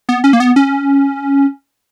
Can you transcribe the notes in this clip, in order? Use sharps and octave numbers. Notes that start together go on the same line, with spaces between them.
B3
C#4
A#3
B3
C#4